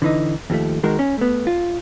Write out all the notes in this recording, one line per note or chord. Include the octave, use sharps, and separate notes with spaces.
D3 E3 D#4
D#2 F3 A3
D#3 G#3 F#4 A#4
C#4
A3 B3
F4